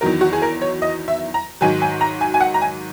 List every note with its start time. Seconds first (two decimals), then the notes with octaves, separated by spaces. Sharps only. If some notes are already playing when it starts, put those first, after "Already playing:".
0.01 E2 D#3 F#3 A#4
0.21 F#4
0.33 G#4
0.42 A#4
0.61 C#5
0.82 D#5
1.08 E5
1.34 A#5
1.61 G#2 D#3 F#3 G#5
1.82 G#5
2.01 A#5
2.21 G#5
2.34 G#5
2.40 F#5
2.54 A#5
2.62 G#5